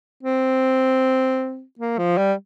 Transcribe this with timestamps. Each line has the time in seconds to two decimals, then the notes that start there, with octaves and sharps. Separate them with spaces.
0.23 C4
1.79 A#3
1.99 F3
2.18 G3